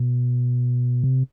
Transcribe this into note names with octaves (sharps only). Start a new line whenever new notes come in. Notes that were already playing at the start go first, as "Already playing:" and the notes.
Already playing: B2
C3